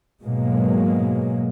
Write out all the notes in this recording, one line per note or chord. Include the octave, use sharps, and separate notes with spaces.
G#2 B2 F#3 G#3 A#3